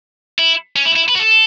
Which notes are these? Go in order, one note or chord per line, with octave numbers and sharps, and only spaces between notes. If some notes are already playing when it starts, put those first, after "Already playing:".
E4
C#4
E4
E4
B4
F#4
A4